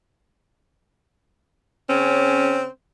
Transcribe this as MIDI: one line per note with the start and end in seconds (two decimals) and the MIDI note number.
1.89 2.67 49
1.89 2.67 60
1.89 2.67 61